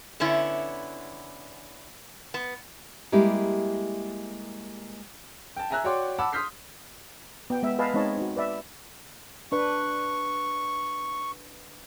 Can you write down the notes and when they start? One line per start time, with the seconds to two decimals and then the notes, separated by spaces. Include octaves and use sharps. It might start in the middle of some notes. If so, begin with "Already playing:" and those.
0.20 D3 B3 C#4 E4
2.34 B3
3.12 G3 G#3 A#3 E4 G4
5.56 G5 A5
5.71 E5 G#5 A#5 E6 F#6
5.84 F#4 C#5 D5 G5 C6 D6
6.18 F#5 A5 B5 D6 E6
6.32 C6 D#6 F6 G6 B6 C7
7.50 B3 G5
7.62 G#3 B3 E5
7.79 B4 D#5 F5 G#5 A5
7.94 G#3 C4 D#4 C#5 D#5 A5
8.18 D#4 F#4
8.36 B4 D5 E5
9.52 D4 B4 C#6